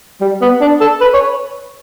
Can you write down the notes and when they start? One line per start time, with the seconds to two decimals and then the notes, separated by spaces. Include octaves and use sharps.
0.21 G3
0.42 B3
0.61 D4
0.81 A4
1.01 B4
1.14 C#5